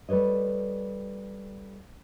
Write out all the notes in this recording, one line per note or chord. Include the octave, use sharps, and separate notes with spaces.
G3 A4 B4 C#5 D#5